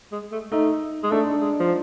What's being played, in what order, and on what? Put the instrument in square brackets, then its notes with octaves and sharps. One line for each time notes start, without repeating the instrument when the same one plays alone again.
[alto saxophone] G#3
A3
[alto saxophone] A3 [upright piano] D#4
[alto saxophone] G#3
[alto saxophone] A3 [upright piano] D4
[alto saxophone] G#3
F3